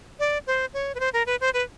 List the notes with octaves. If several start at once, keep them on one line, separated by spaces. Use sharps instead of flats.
D5
C5
C#5
B4
C5
A#4
B4
C5
B4